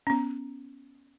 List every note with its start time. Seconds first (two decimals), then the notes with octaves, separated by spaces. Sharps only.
0.07 B3 C#4